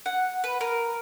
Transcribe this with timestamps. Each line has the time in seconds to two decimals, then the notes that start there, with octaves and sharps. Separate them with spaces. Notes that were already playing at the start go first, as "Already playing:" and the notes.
0.06 F#5
0.44 B4
0.61 A#4